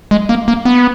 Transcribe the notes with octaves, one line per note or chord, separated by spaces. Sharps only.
G#3
A#3
A#3
B3